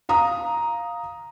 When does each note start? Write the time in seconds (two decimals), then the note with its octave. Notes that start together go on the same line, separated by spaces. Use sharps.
0.09 F5 A#5 D#6